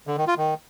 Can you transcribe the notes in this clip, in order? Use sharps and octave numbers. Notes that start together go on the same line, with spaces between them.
D3
D#3
F4
D#3